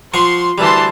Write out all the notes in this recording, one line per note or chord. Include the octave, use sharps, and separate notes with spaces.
F3 F#5 C6 C#6
D2 E3 G3 A5 C6